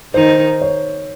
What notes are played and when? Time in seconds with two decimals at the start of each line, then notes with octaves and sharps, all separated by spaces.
0.14 D#3 D#4 C5
0.61 C#5